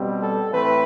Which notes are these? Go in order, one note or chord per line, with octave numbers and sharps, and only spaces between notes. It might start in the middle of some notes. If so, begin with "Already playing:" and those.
Already playing: B2 G3 C4
A4
A2 E3 A3 C4 B4